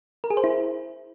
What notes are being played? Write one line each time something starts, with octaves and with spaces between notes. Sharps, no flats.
A#4
G#4
C5
E4